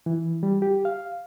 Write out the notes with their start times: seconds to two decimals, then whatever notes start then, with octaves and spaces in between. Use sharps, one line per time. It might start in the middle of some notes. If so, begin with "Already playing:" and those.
0.06 E3
0.43 G3
0.62 G4
0.85 F5